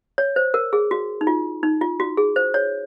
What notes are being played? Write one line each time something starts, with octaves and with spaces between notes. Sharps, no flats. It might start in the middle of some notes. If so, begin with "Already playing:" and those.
C#5
C5
A#4
G#4
F#4
D#4
F4
D#4
F4
F#4
G#4
C5
C#5